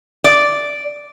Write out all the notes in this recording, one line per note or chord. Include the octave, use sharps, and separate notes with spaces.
D5